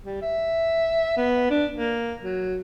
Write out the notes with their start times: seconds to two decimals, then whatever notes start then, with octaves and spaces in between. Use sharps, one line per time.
0.04 G3
0.22 E5
1.17 B3
1.50 D4
1.74 A#3
2.23 F#3